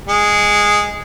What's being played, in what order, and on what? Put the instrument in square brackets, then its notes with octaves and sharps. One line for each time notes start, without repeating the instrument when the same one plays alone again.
[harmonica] G#3